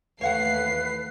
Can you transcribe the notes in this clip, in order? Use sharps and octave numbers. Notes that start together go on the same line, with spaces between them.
D#2 E3 A3 B4 C#5 F5 F#5 C7